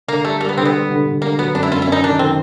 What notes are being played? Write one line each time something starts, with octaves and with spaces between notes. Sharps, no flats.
D3 A#3
G3 A3
G3 A#3
B3
D3 C4
B3
G3
D3
D3
D3 A#3
F#3 B3
F#2 D4
E4
F#2 F4
E4
F#2 D#4
D#3 D4
D#3 C4